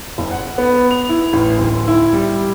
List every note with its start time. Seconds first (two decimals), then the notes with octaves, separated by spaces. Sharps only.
0.18 F#1
0.31 F#5
0.58 B3
0.91 F7
1.09 E4
1.33 A1
1.58 D1
1.88 E4
2.13 G3